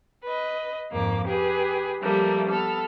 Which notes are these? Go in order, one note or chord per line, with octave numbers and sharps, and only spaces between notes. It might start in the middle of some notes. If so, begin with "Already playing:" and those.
B4 D#5
F2 G#2 A#3 D6
G4 G#4 B4
F3 G3 A3 A#3
B3 A4 F6